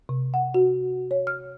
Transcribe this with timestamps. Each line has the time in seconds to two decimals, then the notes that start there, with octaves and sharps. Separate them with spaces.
0.09 C3
0.34 F#5
0.54 F#4
1.11 C#5
1.27 F6